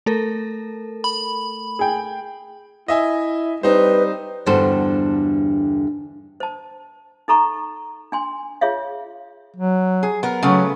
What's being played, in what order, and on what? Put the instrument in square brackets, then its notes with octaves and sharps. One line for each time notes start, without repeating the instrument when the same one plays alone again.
[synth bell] A3 A4 A#4
[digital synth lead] B5
[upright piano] G#4 G5
[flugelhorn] E4 [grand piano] D#5 E5 G#5
[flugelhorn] G3 [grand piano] C4 D#4 C5 [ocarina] B4
[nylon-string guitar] E2 G2 D3 F#4 A4 C5
[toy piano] C5 A5
D#4 A4 A#5 C#6
D4 G#5 C6
F4 G#4 C#5 E5 F5
[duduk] F#3
[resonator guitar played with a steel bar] G#4
B3 A#4
[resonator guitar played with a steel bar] C#3 A3 B3 [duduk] F#3